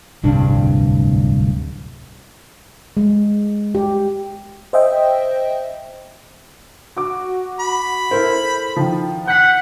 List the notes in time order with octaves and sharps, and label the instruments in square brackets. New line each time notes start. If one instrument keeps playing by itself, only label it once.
[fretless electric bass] D1 C2 G2 D4
[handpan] G#3
G4
[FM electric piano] C5 D#5 E5 G5
[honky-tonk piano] F#4 D6
[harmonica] B5
[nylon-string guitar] E4 A4 A#4 [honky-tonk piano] C5
[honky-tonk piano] D#3 F3
[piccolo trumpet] F#5 [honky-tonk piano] G6 B6